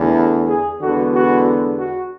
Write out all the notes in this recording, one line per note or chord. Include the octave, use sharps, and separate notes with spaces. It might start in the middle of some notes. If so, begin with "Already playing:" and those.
Already playing: E2 D3 A3
G#4
E2 D3 G#3 B3 F#4
F#4
F#4